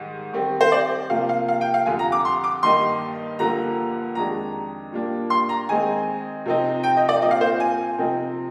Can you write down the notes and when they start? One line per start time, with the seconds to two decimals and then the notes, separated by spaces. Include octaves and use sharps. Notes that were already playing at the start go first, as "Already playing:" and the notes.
Already playing: G#2 D#3 G3
0.33 D#3 G3 C4
0.61 C5
0.72 D5
1.10 C3 F3 A#3 F5
1.29 F5
1.48 F5
1.61 G5
1.74 F5
1.86 F2 D3 G3 G#5
1.99 A#5
2.12 D6
2.25 C6
2.44 D6
2.63 G2 D#3 G3 A#3 D#4 C6
3.39 G2 D3 F3 A#3 A#5
4.15 F2 D#3 G#3 D4 A#5
4.92 A#2 G3 A#3 D4
5.30 C6
5.49 A#5
5.69 D#3 G#3 C4 D#4 G#5
6.46 C3 F3 C4 D#4
6.83 G5
6.97 D#5
7.09 D5
7.21 A#2 F3 C4 D#5
7.31 F5
7.41 C5
7.60 G#5
7.98 C3 F3 C4 D#4